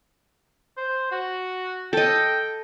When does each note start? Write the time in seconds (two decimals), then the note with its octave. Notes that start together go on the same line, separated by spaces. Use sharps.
0.77 C5
1.11 F#4
1.93 A4 D#5 G5